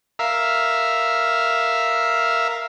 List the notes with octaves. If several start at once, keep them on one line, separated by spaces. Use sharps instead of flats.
A#4 E5 F5